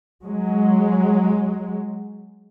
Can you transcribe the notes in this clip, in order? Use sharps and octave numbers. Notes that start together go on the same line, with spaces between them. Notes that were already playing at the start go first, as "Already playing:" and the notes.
F#3 G#3